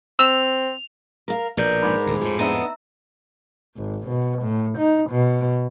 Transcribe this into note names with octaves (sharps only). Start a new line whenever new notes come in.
C4 E6 F7
A#4 F5
A#1 B2 A#4 B4 D5 G6
G#2 B5 D6 G#6
D#1 D2
F2 A2 F3
B3 D4 D#5 E5 A#5 E6
G#1
B2
A2
D#4
B2